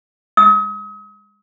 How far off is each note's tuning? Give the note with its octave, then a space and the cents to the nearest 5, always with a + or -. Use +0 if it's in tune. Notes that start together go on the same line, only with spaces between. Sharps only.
D#6 +40